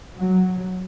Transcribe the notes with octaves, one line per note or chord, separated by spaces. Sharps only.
F#3